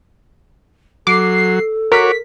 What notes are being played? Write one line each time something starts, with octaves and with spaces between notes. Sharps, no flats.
F#3 A4 D6 C7
F#4 A#4 C#5 D6 B6